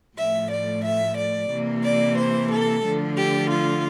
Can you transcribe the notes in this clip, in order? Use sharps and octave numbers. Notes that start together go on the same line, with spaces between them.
A2 F3 A3 E5
D5
E5
D5
C3 E3 A#3
D5
C5
A4
D3 F3 A3
G4
F4